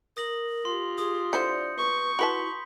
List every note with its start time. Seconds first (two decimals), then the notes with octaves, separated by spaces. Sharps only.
0.17 A#4 D#6 A#6 F#7
0.65 F4 G4 C6
0.98 G#4 D#6
1.33 D3 E4 C5 D5 G6 C#7
1.78 B4 C#6
2.19 E4 F#4 B4 A5 B5 C6 B6